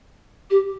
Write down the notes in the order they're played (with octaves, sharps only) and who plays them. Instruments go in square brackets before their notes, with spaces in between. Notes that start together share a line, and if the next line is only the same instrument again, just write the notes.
[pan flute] G4